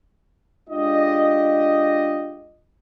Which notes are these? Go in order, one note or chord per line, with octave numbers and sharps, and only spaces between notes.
G#3 D4 F4 G4 D#5